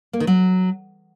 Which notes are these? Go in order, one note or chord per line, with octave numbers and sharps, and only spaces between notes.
A#3
D#3
F#3